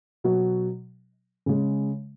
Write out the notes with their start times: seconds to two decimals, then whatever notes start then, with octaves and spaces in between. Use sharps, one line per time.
0.24 B2 F#3
1.46 C#3 G#3